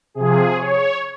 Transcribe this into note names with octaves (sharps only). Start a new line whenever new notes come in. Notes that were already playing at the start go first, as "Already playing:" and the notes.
C3 F3 G#4
C#5